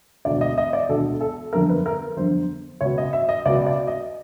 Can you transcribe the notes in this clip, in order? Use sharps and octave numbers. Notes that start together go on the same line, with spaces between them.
E1 D2 D3 D5
D#5
D#5
D5
E1 D2 D3 A4
A4
G1 F2 D3 A#4
B4
A#4
G1 F2 D3 C5
C#2 B2 C#5
D#5
E5
D#5
C#2 B2 D5
D5
D#5